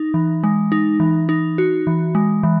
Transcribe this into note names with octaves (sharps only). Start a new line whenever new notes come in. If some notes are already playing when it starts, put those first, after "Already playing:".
Already playing: D#4
E3
G#3
D#4
E3
D#4
F#4
E3
G#3
E3